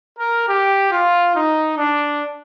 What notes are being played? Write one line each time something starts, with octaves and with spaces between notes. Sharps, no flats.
A#4
G4
F4
D#4
D4